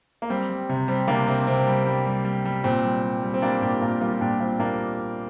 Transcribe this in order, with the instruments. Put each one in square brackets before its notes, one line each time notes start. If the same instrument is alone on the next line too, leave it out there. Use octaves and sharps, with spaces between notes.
[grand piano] A#3
G3 C4
G3
C3
G3 C4
C3 A#3 D4
C3 C4
C3 C4
G3
G3
G3
G3
G3
A#2 C4
G3
G3
G3
C4
G3 A#3 D4
A#2 D4 G4
G4
A#2 F4 A#4
G3 F4 A#4
F4
A#2 D4 G4
G3 C4 F4
A#2 A#3 D4